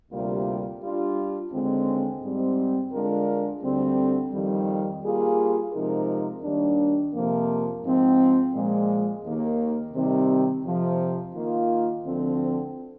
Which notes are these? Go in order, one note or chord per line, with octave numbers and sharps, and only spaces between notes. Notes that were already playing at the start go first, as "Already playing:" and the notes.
D2 C3 G3 A#3 F4
G3 D4 F4
D#2 D3 G#3 C4
G#2 G3 C4
D3 G#3 D4 F4 A#4
D2 D3 G3 C4
F2 D#3 G3
G3 A#3 F4 G#4
C3 F3 G#3 D#4 A#4
D#2 D#3 G3 D4
F2 C3 F3 A#3
G#2 F3 C4
A#2 F3 G#3
D#2 D#3 A#3
C3 D#3 G3 C4 G4
F2 C3 F3
D#3 A#3 F4
D2 D3 F3 C4